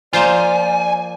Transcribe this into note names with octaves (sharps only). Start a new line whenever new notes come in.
F3 A#3 F4 C5 D5 G#5